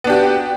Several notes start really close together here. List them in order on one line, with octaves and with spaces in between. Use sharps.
B3 D4 G4 F#4